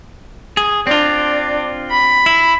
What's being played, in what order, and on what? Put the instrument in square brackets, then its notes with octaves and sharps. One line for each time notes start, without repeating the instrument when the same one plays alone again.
[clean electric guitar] G#4
[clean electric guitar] C4 F4 [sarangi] D4
[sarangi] B5
[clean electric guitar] E4